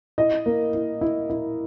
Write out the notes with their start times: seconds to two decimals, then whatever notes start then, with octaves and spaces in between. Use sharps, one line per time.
0.18 E4 D#5
0.46 A#3
0.74 E4
1.01 E4
1.30 E4